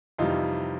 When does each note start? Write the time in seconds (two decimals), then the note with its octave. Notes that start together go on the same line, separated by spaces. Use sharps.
0.18 F2 C3 E3 G3 D#4 F4